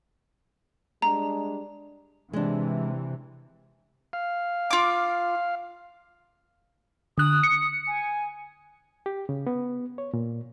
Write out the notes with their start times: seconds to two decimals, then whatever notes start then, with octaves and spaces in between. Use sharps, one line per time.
1.02 G3 G#3 D4 A#5
2.33 C3 E3 G#3 D4
4.13 F5
4.71 F4 D6
7.18 D3 D#6 F#6
7.43 C#7
7.87 G#5
9.06 G4
9.29 C#3
9.47 B3
9.98 C#5
10.14 A#2